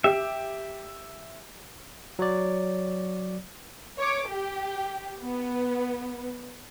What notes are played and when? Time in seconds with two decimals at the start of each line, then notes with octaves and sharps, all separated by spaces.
0.04 G4 E5
2.19 F#3 C#5 D5
3.98 C#5 D6
4.28 G4
5.21 B3